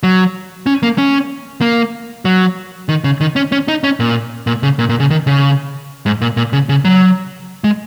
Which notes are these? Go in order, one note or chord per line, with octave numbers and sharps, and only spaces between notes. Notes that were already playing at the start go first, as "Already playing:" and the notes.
F#3
C#4
A#3
C#4
A#3
F#3
D#3
C#3
D#3
C#4
C#4
D#4
C#4
A#2
A#2
C#3
A#2
A#2
C#3
D#3
C#3
G#2
A#2
A#2
C#3
C#3
F#3
G#3